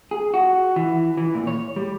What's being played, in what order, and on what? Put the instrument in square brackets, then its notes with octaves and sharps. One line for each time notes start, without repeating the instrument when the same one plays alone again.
[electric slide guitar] G#4
F#4
E3
E3
A#2
C#5
G3